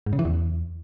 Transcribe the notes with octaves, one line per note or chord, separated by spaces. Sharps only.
G#2
C#3
E3
E2